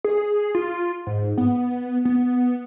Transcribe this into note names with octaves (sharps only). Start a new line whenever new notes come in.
G#4
F4
G#2
B3
B3